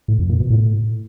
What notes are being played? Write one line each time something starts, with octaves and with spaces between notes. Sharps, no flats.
A2
F2
A#2
B2
A2